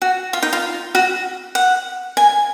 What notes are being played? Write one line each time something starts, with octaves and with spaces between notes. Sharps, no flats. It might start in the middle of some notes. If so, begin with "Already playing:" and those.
F#4
F4
D#4
F4
F#4
F#5
G#5